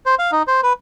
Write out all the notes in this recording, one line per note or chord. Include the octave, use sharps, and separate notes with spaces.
C5
F5
D#4
C5
B4